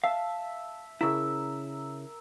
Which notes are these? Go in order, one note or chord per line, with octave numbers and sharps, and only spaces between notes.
E5 F5 A5
C#3 E4 A#4 E5 E6